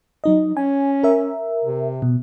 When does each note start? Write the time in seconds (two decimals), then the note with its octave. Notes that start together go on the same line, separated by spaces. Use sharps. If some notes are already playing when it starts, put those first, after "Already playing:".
0.24 F#3 D#4 D#5
0.57 C#4 G#5
1.03 A#4 E5
1.65 C3
2.02 B2